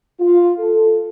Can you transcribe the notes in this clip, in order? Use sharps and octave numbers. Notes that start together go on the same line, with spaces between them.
F4
A4